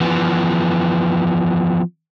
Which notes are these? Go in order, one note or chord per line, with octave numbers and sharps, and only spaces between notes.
E3 F3 B3